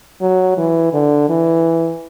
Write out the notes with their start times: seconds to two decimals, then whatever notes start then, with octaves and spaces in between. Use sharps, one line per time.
0.21 F#3
0.57 E3
0.93 D3
1.29 E3